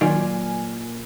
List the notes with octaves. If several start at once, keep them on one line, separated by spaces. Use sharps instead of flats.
A#2 D#3 F#3 F4 D5 G#5 F6